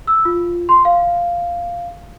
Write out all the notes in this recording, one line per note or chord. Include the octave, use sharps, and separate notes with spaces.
E6
F4
C6
F5